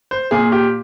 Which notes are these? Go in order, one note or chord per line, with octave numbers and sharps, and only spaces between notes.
C5
A#2 G#4
G4